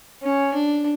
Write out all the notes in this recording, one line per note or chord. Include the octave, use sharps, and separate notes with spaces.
C#4
D4